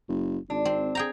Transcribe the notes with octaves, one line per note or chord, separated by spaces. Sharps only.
F#1
G#1 D4
C4
G#4 G5 A#5